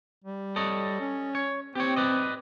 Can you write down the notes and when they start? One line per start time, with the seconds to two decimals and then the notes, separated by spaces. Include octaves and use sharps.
0.24 G3
0.56 A4 C#5 D#5
1.00 C#4
1.35 C#5
1.75 C4 G4 C#5
1.96 B4 D5 D#5